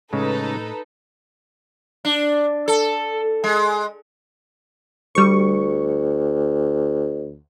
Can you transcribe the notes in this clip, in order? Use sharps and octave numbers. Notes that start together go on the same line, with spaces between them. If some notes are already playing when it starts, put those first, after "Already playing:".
A2 C#3 G#3 D#4 A4 B4
D4
A4
G#3
D2 G3 C#6